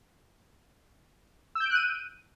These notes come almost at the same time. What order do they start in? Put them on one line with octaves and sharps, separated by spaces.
E6 G6 D7 F#6 D#7